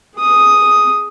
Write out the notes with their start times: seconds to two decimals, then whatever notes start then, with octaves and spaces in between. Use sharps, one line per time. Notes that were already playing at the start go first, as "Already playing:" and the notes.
0.16 G#4 D#6